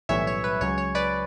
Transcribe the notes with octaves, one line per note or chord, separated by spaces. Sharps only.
B1 A2 E3 G3 C#4 C#5 E5
C#5
B4
C#2 C#3 F#3 C#4 C#5
C#5
B4 D5